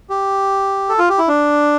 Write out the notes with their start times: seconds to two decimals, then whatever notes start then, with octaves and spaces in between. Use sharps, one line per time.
0.10 G4
0.89 A4
0.99 F4
1.09 G4
1.18 E4
1.28 D4